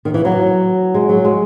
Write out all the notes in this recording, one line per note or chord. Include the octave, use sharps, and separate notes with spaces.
D#3
E3
F#3
G#3
F#3
G#3